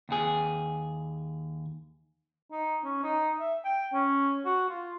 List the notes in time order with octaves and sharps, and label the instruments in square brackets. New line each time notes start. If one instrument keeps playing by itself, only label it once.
[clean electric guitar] D#2 G#4
[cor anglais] D#4
C#4
D#4
E5
G5
C#4
F#4
F4